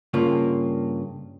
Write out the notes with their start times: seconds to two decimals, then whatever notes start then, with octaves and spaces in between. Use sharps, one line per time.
0.14 G2 C#3 A#3 F4